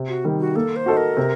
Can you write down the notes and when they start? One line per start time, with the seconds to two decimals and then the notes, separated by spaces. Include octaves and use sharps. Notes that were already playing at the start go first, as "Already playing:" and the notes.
Already playing: C3
0.08 F#4
0.24 D#3 G3
0.40 F#4
0.55 A#3 A4
0.76 C5
0.86 F#4 A4 D#5
0.97 A#4
1.17 C3